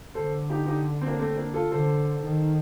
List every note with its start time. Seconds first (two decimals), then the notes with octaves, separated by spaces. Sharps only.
0.14 D3 A4 C5
0.50 D#4 G4
0.67 D#4 G4
1.01 C4
1.06 A#3 D4
1.19 A3 C4
1.36 A#3 D4
1.54 F4 A4
1.72 D3 A4 C5
2.24 D#3